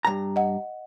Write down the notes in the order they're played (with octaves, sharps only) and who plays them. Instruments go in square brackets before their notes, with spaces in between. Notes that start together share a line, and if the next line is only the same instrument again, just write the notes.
[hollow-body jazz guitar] G2 A#5
[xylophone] D#5 F#5